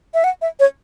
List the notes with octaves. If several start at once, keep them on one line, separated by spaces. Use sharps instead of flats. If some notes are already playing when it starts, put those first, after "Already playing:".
E5
F#5
E5
C#5